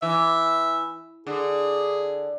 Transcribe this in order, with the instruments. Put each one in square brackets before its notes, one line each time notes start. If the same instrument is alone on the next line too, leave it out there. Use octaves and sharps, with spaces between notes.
[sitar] E3 [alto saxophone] E5
[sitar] D3 [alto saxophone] G#4